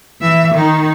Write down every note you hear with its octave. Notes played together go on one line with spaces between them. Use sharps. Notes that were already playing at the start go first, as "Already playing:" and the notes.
E3 E5
D#3 D#4